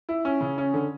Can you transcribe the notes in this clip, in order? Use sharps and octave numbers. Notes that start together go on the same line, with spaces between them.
E4
C#4
C#3
C#4
D3